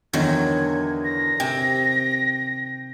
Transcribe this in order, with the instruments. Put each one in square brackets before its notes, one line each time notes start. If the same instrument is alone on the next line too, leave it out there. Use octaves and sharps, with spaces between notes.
[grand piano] E2 D3 D#5 [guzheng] D#3 F#3 [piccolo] G#6
[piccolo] A#6
[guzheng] C3 [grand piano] G5